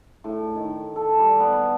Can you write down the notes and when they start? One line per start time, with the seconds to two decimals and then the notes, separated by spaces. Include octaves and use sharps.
0.24 A2
0.55 D#3
0.96 A4
1.18 G3
1.40 B3